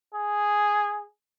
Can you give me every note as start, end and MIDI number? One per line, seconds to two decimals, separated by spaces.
0.14 1.05 68